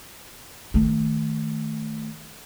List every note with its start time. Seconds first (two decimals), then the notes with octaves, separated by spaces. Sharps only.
0.74 D#3 A3